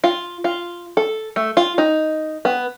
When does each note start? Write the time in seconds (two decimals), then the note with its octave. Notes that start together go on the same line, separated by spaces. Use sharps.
0.04 F4
0.44 F4
0.97 A4
1.36 A3
1.57 F4
1.78 D#4
2.45 B3